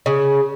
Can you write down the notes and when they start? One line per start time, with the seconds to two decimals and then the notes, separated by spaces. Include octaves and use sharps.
0.06 C#3